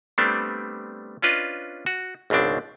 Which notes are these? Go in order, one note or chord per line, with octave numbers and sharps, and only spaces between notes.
G3 A3 B3 C4 D4
C#4 D4 F4 B4 D#5
F#4
G#1 C#2 B2 C4 D4